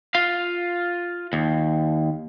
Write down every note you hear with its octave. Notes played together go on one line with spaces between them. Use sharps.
F4 F5
D#2